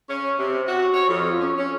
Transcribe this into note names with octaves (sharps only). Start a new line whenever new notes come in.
C#4
C3
F#4
C#5
F2
C#4
C#4